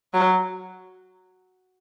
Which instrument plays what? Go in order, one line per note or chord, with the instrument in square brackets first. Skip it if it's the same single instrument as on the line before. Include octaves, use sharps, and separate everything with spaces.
[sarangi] F#3